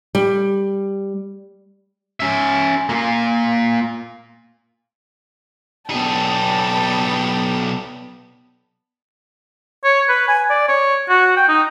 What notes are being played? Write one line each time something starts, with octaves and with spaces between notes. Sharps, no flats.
G3
C#4 E5
A#2 A#3
B1 B3 G#4 D5 G5 A5
C#5
B4
G#5
D5
C#5
F#4
G5
D#4